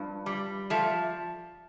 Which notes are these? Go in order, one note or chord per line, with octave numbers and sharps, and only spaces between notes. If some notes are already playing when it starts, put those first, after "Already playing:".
Already playing: G2 F3
G3
F3 A3